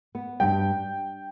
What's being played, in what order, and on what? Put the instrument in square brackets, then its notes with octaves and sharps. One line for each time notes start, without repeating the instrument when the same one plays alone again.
[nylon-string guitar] B3
[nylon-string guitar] G2 [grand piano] G5